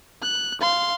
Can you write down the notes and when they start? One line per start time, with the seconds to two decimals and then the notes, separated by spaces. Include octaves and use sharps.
0.22 F#6
0.61 F5 C6